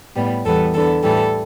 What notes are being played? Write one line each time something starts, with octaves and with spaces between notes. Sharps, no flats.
A2 G3 B3
E2 E3 G3 B3 A4
E2 D3 B3 A4
A2 E3 G3 A4